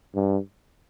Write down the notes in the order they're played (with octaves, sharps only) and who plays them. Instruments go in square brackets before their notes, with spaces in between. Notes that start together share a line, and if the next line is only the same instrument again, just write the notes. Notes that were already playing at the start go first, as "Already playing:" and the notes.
[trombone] G2